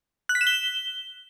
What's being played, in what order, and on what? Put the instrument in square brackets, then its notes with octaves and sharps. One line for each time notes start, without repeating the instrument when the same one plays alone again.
[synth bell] F#6
B6
E7
G7